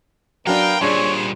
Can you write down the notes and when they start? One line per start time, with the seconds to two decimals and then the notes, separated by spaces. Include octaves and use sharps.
0.47 F#3 B3 D4 A#4 F5 G5
0.81 A#2 G3 D4 G#4 C5 C#5